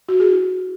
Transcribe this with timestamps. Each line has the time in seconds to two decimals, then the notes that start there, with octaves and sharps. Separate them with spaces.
0.09 F#4
0.20 G#4
0.31 E4